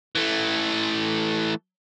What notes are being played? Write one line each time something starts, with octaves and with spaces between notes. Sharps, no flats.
E3 A3